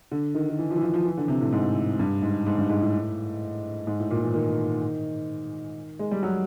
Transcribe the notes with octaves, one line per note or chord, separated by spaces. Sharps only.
D3
D#3
D#3
E3
F3
E3
F3
F3
E3
D3
C3
A2
G#2
G2
G#2
G#2
G2
G#2
A2
G#2
A2
A#2
E3
D#3
G#3
G3
F#3